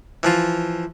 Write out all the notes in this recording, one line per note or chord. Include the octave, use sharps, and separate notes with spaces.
E3 F3 F4